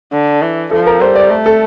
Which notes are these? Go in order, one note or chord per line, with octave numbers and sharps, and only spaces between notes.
D3
E3
F3 A4
A#4
G3 C5
D5
A3
A4